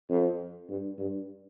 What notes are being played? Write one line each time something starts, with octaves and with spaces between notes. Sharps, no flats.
F2
G2
G2